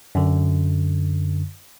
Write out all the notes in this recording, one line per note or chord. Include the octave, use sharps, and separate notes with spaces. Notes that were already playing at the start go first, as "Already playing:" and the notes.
F#2 D3